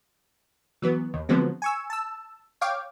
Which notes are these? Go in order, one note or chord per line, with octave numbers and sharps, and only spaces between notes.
E3 F#3 B3
D#2
D3 F3 F#3 G#3 B3 C4
G#5 C#6 E6
A5 E6
C#5 F5 G5 D6